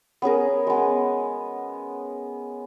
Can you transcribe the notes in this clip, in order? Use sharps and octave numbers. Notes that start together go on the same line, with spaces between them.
B3 C#4 G#4 A#4
G#3 B3